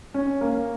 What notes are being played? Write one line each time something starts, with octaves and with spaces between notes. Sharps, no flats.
C#4
A#3